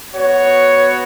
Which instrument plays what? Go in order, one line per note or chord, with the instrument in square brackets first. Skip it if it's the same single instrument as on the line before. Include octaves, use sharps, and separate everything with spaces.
[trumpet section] B3 F#4 C#5